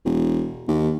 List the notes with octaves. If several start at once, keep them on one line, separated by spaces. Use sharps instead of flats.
E1
D#2